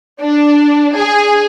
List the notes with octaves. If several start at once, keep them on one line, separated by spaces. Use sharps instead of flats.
D4
G#4